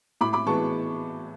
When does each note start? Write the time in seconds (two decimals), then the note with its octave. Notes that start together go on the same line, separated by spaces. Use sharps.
0.21 A2 B5 D6
0.33 B5 D6
0.46 E3 G#3 B3 A5 C#6